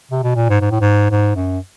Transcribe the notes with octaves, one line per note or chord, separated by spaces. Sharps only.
C3
B2
A#2
G#2
G#2
A2
G#2
G#2
F#2